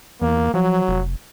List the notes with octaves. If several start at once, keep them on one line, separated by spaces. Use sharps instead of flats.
E2 A#3
F3 F#3
F1